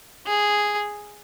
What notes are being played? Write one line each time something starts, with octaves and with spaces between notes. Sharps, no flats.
G#4